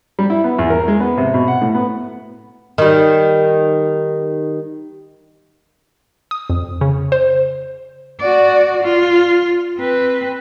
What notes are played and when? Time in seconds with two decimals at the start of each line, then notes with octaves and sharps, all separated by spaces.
0.19 G3
0.30 E4
0.44 B3
0.59 E2
0.70 A#4
0.88 G#3
1.00 B3
1.17 C3
1.34 B2
1.48 F#5
1.62 A2
1.75 B3
2.78 D#3 G3
6.31 D#6
6.50 F2
6.81 C#3
7.12 C5
8.20 F#4 D5
8.83 F4
9.79 C4 B4